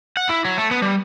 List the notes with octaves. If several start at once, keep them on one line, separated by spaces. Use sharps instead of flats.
F#5
E4
F#3
A3
B3
G3